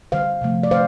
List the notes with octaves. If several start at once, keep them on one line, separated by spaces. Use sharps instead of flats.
D3 G3 C5 F5
C3 F3 A3
D5
A3 C5 F5